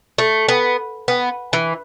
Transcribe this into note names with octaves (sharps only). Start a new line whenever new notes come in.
A3
B3
B3
E3